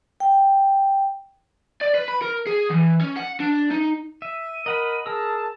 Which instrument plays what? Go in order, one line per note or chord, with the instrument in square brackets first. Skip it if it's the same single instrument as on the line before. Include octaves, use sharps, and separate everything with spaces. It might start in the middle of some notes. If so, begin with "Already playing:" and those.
[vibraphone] G5
[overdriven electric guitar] D5
B4
B5
A#4
G#4
E3
C#4
F#5
D4
D#4
[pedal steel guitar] E5 [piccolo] D#7
[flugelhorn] A#4 [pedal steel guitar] D#5 F#5 B5
[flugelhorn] G#4 [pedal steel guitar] A#4 E6 [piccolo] A5